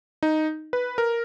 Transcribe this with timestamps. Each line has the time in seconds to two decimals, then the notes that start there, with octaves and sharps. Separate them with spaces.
0.23 D#4
0.73 B4
0.98 A#4